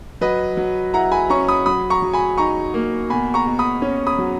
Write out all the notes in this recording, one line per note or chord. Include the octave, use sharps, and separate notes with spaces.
F#3 B4 D#5
F#3
E4 F#5 A#5
G#5 B5
C#4 A#5 C#6
B5 D#6
F#3 B5 D#6
A#5 C#6
F#3
G#5 B5
D#4 A#5 C#6
A#3
B2 G#5 B5
A#5 C#6
B2
B5 D#6
C#4
B5 D#6
F#3